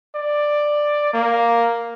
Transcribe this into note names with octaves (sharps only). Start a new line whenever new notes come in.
D5
A#3